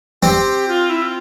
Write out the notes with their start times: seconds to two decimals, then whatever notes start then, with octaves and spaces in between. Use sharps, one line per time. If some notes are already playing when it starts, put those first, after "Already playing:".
0.22 C4 G4
0.68 F4
0.90 E4
1.02 F4